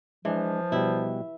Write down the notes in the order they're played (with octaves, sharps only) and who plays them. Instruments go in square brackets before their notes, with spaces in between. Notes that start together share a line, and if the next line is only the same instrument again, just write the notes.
[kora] E3 [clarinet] F3 [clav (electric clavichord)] G#3 D4
[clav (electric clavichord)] B2 G3 [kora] E4